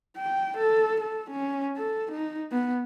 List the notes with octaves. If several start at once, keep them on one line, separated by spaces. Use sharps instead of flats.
G5
A4
A4
C#4
A4
D#4
B3